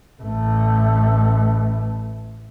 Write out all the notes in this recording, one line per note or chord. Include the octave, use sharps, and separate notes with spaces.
A1 A3